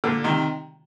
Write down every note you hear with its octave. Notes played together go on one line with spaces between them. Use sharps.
A#2 D3
C3 D#3